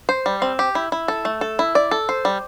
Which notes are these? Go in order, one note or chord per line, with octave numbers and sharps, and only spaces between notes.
C5
G3
C4
G4
E4
E4
A4
A3
A4
E4
D5
A4
C5
G3